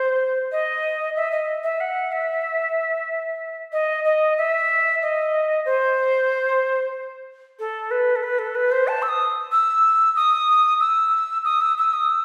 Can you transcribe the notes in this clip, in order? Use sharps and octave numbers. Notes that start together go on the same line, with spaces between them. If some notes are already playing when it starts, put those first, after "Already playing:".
Already playing: C5
D#5
E5
D#5
E5
F#5
E5
D#5
D#5
E5
D#5
C5
A4
B4
A4
B4
A4
B4
C5
A5
E6
D#6
E6
D#6
E6
D#6
E6
E6
D#6
E6